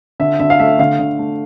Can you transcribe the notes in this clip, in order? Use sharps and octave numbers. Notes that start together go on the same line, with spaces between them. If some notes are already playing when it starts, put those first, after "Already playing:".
D3 E5
D3 E5
F5
A3 E5
D3 F5
D3
A3